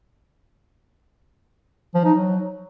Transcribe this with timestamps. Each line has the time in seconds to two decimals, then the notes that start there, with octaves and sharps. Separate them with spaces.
1.94 F3
2.04 D#4
2.15 F#3